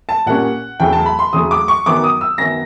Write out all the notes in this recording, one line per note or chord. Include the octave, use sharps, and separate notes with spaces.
A5
A#2 G3 A#3 C#4 F#5
E2 C#3 F#3 A3 G5
A5
B5
C6
E2 C#3 F#3 A3 D#6
D6
C#6
F#2 D#3 F#3 B3 D6
D#6
E6
F#2 D#3 F#3 B3 A#6